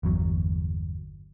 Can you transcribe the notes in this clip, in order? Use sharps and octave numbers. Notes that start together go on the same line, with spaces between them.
G1 E2 F#3